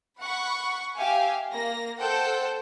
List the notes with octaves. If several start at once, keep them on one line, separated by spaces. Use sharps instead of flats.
F#5 B5 C#6
G4 E5 F5 G5 G#5
A#3 A#6
A4 C5 F#5 G5